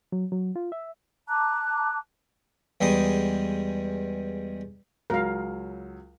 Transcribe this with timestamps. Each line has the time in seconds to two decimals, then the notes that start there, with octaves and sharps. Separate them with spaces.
0.12 F#3
0.32 F#3
0.56 F4
0.72 E5
1.28 A5 A#5 D6 F#6
2.81 E2 G3 G#3 D#6
5.10 C#2 F#3 A#4 F5